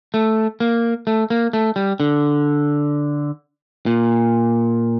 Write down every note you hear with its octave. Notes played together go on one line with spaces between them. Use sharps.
A3
A#3
A3
A#3
A3
G3
D3
A#2